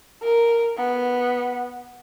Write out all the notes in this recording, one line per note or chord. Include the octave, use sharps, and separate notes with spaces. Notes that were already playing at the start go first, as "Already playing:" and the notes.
A#4
B3